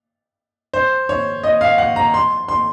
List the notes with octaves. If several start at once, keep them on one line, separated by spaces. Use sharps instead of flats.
C5
C#5
D#5
F5
F#5
A#5
C6
C6